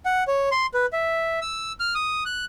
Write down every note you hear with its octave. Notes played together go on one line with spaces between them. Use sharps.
F#5
C#5
C6
B4
E5
E6
F6
D#6
F#6